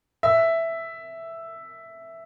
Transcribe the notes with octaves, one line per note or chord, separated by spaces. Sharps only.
E5